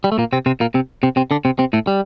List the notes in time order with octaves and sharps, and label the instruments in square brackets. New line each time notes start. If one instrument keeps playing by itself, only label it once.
[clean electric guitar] G3
A3
A#2 A#3
C3 C4
C3 C4
A#2 A#3
C3 C4
C3 C4
C3 C4
D3 D4
C3 C4
C3 C4
A2 A3
G3